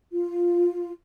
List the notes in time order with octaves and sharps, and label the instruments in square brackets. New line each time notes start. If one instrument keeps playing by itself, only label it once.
[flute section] F4